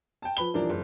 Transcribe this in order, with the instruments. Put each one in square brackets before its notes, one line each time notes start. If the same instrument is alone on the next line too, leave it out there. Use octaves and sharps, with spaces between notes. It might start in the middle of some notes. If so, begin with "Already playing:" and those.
[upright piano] G5 A5
F3 B4 B5 G7
D#1 E3 F3 D4 A#4 D5
F#1